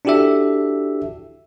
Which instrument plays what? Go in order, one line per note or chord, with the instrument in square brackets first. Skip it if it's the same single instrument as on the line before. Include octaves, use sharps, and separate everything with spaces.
[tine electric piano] D4 E4 F#4 G4 A4 E5